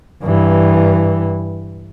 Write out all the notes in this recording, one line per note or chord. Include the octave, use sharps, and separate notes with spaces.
G2 E3